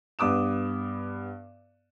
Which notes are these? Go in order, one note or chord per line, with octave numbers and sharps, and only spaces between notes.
G2 B3 D6 D#6 E7